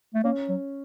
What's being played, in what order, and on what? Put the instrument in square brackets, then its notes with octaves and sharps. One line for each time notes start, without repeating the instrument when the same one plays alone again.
[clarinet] A3
[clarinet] A#3 [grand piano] C#4
[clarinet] F#3